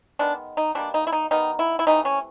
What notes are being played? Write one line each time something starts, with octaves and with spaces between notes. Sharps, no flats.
D#3 G#3 B3 D4
D#4
B2 G3 A#3 D4
D#4
E4
D#4
D#3 G3 B3 D#4
E4
E4
C3 E3 A3 D#4
C#4